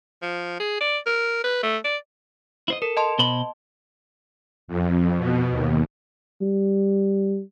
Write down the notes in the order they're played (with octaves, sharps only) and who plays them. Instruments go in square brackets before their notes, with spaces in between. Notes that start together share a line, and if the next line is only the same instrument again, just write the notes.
[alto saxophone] F3
G#4
D5
A#4
B4
A3
D5
[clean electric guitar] E4 C5 D#5
[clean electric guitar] A4 [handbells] A#4
[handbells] D#5 A5 C6
[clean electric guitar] B2 C5 B5
[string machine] F2
B2
D#2
[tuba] G3